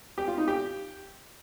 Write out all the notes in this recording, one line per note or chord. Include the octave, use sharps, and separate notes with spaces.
G4
F4
D#4
G4